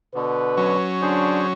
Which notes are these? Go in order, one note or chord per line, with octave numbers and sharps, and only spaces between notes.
B2 D3 B4
F#3 C#4
D3 D4 G#4 C5